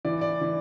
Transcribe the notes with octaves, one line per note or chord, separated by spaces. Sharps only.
E3 D5
D5
E3